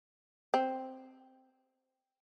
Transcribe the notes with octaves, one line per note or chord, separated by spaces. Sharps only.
C4